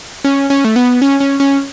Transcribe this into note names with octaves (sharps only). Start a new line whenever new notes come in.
C#4
C#4
A3
B3
C#4
C#4
C#4